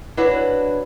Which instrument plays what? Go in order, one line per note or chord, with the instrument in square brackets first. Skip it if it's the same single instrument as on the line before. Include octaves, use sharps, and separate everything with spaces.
[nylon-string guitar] D4 E4 F#4 B4 C#5